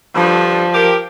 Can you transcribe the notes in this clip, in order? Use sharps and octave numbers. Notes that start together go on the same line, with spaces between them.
G2 D3 F3 G3
G4 A#4